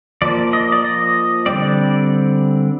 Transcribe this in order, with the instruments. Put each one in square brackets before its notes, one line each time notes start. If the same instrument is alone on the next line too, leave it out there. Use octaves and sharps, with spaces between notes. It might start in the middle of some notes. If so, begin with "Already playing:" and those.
[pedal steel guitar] F3 A#3 D5
D#5
D5
D#5
D3 G3 C4 D5